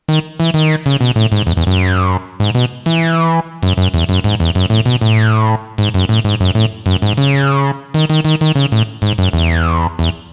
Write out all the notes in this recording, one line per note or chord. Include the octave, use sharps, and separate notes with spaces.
D#3
E3
D#3
C#3
B2
A2
G#2
E2
E2
F#2
G#2
B2
E3
F#2
F#2
E2
F#2
G#2
E2
F#2
A2
B2
A2
G#2
F#2
A2
G#2
F#2
A2
F#2
G#2
C#3
D#3
D#3
D#3
D#3
C#3
A2
G#2
F#2
E2
E2